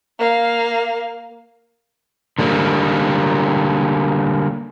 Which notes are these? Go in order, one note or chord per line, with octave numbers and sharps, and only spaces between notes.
A#3 F5
D3 G3 A#3